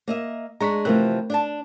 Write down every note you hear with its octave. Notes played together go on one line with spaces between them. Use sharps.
A#3 D#5 E5
G#3 D4 A#5 C#6 B6
C3 E3 F3 A3 A#4 F#6
D4 D5 A5